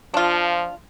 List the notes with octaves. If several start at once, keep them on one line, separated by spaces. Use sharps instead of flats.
F3 D4 F4